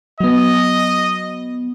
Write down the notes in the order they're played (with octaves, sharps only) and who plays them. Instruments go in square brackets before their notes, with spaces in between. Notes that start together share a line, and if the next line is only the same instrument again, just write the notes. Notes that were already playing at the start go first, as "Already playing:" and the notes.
[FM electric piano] F#3 B3 [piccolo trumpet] D#5